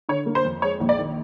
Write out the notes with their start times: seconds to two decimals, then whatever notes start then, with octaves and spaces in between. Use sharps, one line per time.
0.09 D3 C#5
0.26 A#3
0.35 C5
0.45 F2
0.62 G#3 C#5
0.80 A#1
0.89 D5
0.99 D#3